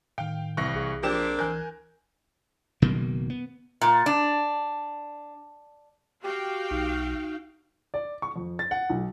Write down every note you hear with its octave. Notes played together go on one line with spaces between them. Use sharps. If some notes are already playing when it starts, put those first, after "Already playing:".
A2 D#3 F5 G5
C2 E3 C#6 F#6 A#6
B1 G#4 F5
F3 A#3 C4 D4 G4 E7
C#2 E3 A#4 G#5 F#6 G6
F#1 B2 D#3 A#3
B3
A#2
D4
F#4 G4 F5 G5
B1 D#4
D5
C#6
F2
A6
F#5
B1